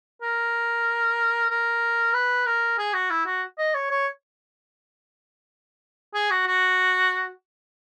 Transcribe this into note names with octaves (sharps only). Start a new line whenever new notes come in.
A#4
A#4
B4
A#4
G#4
F#4
E4
F#4
D#5
C#5
C#5
G#4
F#4
F#4